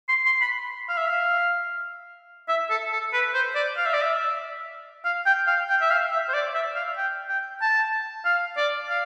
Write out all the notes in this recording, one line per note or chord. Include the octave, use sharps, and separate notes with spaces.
C6
C6
B5
F5
E5
F5
E5
A4
A4
B4
C5
D5
F5
E5
D5
E5
F5
G5
F5
G5
E5
F5
E5
C5
D5
E5
F5
G5
G5
A5
F5
D5
F5